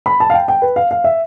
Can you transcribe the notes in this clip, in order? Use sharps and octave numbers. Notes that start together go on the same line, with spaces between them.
B5
A5
F5
G5
G5
B4
F5
F5
E5